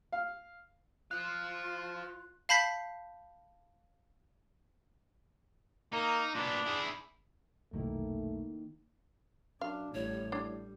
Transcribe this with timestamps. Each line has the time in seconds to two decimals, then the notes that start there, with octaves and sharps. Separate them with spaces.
0.12 F5
1.11 F4 C5 F5 F#6
2.49 F5 A5 B5 G6 B6 C7
5.93 A#3 D#4
6.35 A#2 B3 D4
6.66 E4 G#4
7.73 F1 B1 D#3 F#3 A3 A#3 E4
9.61 F#2 D4 F5
9.94 A1 A2 G3 C#5
10.32 G3 D4